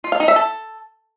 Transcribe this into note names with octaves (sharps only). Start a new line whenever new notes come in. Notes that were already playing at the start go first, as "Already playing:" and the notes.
F4
F5
D#4
E5
A4